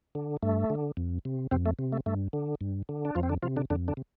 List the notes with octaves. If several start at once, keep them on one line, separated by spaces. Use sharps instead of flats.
D3
G2 A3
D3
F2
C3
F2 C3 C4
A3
C3
A3
G2 A3
D3
G2
D3
D4
F2 F3 F4
C4
D3 D4
C3 F3 F4
D3 D4
F2 D3 D4
D3 D4
C3